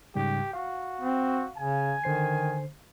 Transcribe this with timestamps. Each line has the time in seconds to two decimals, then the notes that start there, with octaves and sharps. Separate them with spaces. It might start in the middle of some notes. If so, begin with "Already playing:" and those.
0.15 G#2 C#3 G3 G4
0.53 F#4 F5
1.01 C4
1.57 C#3 G#5
2.04 D3 D#3 C5 C7